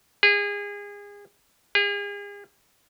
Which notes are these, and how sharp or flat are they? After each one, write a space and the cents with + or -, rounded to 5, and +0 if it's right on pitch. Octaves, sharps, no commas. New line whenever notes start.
G#4 -30
G#4 -40